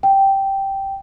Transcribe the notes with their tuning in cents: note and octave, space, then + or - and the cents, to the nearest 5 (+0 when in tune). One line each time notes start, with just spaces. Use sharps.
G5 -5